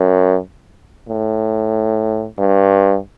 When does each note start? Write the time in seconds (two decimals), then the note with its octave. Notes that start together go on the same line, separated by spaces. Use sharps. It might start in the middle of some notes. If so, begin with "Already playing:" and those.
Already playing: F#2
1.09 A2
2.39 G2